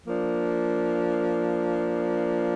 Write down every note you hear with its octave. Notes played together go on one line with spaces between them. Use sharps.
F3 A#3 D4